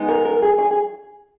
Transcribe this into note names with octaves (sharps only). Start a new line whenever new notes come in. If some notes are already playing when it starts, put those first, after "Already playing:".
Already playing: G#3 B3 D#4
A#4
A#4
G#4
G#4
G#4